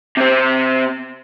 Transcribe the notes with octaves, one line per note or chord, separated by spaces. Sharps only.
C3 C4